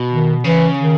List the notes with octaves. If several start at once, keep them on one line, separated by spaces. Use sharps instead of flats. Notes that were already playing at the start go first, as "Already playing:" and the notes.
Already playing: B2
D#3
C#3 E3
D#3